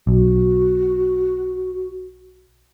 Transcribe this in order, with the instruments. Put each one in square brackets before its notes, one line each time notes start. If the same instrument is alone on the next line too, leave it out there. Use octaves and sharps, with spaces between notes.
[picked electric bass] B1 [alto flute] F#4